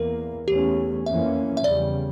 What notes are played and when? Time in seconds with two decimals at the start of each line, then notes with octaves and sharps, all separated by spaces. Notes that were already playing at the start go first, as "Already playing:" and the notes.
Already playing: E2 E3 A#3 A#4
0.47 E2 E3 A3 C#4 G4
1.06 F2 E3 A#3 C#4 E5
1.57 E5
1.64 E2 C#3 G3 D5